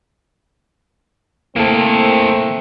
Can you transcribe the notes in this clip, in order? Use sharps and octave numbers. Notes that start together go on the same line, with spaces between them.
A3 A#3 C4 E4 A4 A#4